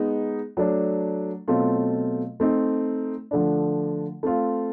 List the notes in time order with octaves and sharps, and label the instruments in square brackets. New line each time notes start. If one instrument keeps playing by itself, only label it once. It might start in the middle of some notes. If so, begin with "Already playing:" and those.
Already playing: [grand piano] G#3 B3 D#4
F#3 A3 D4
B2 F#3 A3 C4 F4
A3 C4 D#4
D3 F3 A3 D4
A3 C4 F4